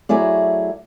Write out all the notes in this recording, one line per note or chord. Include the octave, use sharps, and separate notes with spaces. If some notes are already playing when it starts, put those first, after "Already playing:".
F#3 A3 E4 G#4 D5